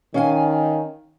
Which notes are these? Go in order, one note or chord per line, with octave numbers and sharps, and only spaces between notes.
D#3 C#4 F5 G#5